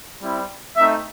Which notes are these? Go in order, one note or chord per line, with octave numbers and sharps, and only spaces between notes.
G3 C4 E4
A3 C4 D#4 E5